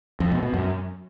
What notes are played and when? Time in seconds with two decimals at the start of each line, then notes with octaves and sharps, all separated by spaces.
0.20 F2
0.31 B2
0.43 B2
0.54 F#2